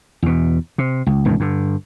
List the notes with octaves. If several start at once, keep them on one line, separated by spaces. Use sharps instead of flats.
E2 B2
C3
C#2
E1 C#2 G2 D#3
G2 D3